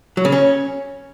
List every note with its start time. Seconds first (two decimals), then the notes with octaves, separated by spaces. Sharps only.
0.17 F#3
0.25 C#3
0.32 C#4